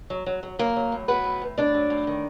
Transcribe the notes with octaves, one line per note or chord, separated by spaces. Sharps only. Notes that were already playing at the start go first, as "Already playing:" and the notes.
F#3
F#3
F#3
F#3 A#3 A#4
F#3
A2
F#3 B3 B4
A2
A2
A2 D4 D5
F#3
A2
D#3